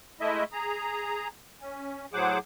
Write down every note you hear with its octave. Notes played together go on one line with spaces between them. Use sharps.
G#3 A3 E4 D#5 E5
G#4 A#5
C#4
A2 F#3 G#4 C5 F#5 D6